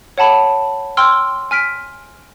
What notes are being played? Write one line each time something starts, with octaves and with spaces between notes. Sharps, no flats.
C#5 F#5 A5 B5
G5 C6 E6 F6
G#5 F6 B6 D7